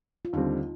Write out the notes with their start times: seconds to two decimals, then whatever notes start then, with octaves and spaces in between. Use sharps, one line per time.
0.25 F4
0.33 D#2 D3 G3 C4 D#4